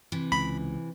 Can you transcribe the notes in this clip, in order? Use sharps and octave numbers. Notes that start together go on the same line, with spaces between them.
C3 E3
C#2 B5